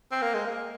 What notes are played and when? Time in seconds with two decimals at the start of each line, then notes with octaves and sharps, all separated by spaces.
0.12 C4
0.22 A#3
0.34 G#3
0.45 A#3